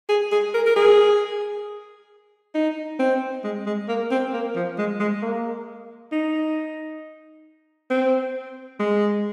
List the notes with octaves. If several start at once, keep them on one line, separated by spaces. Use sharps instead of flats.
G#4
G#4
A#4
A#4
G#4
D#4
C4
G#3
G#3
A#3
C4
A#3
F3
G#3
G#3
A#3
D#4
C4
G#3